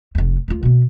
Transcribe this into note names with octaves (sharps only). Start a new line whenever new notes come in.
F1 F2
D2 F4
B2 B3